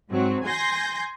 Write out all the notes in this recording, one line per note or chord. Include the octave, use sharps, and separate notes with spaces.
G#2 F#3 C4
G#5 C6 G6 A#6